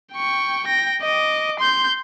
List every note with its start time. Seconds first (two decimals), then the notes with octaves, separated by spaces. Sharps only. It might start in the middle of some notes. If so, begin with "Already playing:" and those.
0.13 G5 C#6
0.67 G5 A#6
1.02 D#5 D6
1.60 C6 G6